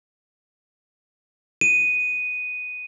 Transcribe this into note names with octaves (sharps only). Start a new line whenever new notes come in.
D#7